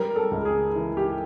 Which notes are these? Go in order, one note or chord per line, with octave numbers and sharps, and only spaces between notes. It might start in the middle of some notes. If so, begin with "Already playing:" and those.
Already playing: G3 A#4
A4
C#2
G#4
E3
G4